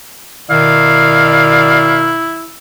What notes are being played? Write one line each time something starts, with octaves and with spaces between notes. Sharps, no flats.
B2 D#3 E4 D5 F5